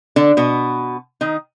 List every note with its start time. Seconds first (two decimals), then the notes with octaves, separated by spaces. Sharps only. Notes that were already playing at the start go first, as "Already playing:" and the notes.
0.16 D3 D4
0.37 B2 B3
1.21 D#3 D#4